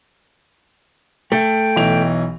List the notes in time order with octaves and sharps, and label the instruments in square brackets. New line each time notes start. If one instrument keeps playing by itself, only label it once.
[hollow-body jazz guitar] A3 [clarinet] G5
[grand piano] B1 E3 F7